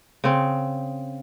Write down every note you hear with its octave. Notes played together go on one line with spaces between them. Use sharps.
C#3 C4